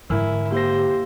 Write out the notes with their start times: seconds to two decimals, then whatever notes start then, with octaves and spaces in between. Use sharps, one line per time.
0.10 G#2 D3 E4 A#4 G#5 E6
0.52 A#3 G4 C5 A#6